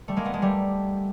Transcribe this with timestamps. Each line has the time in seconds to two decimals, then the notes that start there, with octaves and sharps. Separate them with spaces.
0.08 G3 A3
0.17 G#3 A#3
0.25 A3 B3
0.34 G#3 A#3
0.42 G3 A3